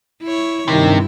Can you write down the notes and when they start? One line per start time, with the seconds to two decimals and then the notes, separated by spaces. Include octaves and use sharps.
0.23 E4 C#5
0.68 G2 C3 D#3 E4